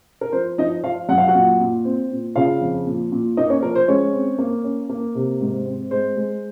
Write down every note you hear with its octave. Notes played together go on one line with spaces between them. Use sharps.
A#4
F3 C5
F3 D#4 D#5
F3 F4 F5
F#2 F#5
F5
F#4 F#5
A#2
A#2
C4
A#2
C#3 F4 F5
F2
A#2
A#2
A#3 D#4 D#5
C#4 C#5
F3 A#4
C5
G#3 C#4 C#5
C4
A#3
C#4
A#3
C3
G#2
C4
G#3 C5
G#3